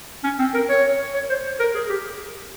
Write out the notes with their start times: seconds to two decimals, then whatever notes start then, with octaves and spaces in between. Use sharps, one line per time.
0.24 C#4
0.39 C4
0.54 A#4
0.69 C#5
1.14 C#5
1.30 C5
1.60 A#4
1.74 G#4
1.89 G4